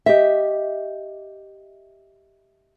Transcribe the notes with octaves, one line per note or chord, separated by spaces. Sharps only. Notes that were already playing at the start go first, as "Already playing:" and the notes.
G4 D#5 E5